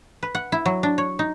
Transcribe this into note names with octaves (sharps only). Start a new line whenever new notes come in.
B4
F#5
E4
F#3
D4
C#5
D#4